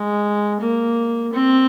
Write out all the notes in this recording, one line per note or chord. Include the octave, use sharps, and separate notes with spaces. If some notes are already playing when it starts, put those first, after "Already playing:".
Already playing: G#3
A#3
C4